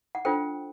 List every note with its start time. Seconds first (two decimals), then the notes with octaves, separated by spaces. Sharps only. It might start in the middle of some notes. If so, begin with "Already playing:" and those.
0.15 F#5
0.25 D4 F4 A4 C5 G5